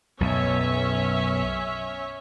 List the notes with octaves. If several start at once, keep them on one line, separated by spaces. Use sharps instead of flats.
B1 F#2 C#4 C#5 E5